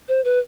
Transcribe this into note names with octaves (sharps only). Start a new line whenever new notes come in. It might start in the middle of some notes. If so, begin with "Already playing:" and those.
C5
B4